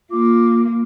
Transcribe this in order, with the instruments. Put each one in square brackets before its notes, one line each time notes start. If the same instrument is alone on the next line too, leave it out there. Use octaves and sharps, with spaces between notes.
[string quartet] A#3 [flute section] F4 D6